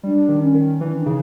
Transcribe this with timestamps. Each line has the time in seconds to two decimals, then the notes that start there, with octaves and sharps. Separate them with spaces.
0.03 G3 D4
0.29 D#3
0.42 C#4
0.54 D#3
0.81 E3 D4
0.89 C#4
0.97 D4
1.06 C#3 D#4